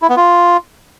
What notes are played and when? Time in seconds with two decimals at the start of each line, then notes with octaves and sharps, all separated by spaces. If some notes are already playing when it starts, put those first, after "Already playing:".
0.02 E4
0.09 B3
0.17 F4